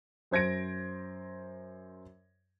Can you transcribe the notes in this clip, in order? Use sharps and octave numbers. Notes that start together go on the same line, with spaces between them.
F#2 C5 G#6 A#6 D7